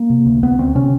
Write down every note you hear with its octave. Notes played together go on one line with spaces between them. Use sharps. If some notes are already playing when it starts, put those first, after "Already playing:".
Already playing: A#3
C3
D2
D2 B3
D2 C4
C3 C#4